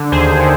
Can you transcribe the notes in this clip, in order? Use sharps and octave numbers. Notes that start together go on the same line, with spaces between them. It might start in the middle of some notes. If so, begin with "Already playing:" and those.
Already playing: D3
D#2 G#4 C5
D3